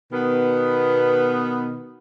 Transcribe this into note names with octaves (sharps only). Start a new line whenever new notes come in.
B2 D#3 B3